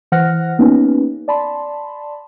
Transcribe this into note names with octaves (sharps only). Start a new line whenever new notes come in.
E3 C5 F#5 F6 F#6 A#6
A#3 B3 C#4 D#4 G4 B4
D5 A5 B5 C6